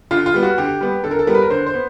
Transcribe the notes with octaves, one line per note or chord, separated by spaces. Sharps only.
D3 F4
F4
G3 B3
F#4
D3 G4
G3 B3
D3 A4
A#4
A4
G3 B3 A#4
B4
A#4
D3 C5
C5
B3